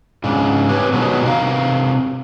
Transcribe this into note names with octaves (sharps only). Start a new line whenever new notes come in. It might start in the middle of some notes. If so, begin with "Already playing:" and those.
G#2 C#3 D4
C4 G4 G#4 B4 C#5
B2 D#3 F#3 G#3 A3 B3
C3 A#4 F5